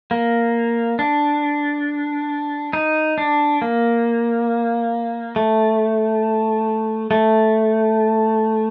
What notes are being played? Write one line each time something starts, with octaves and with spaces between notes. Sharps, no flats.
A#3
D4
D#4
D4
A#3
A3
A3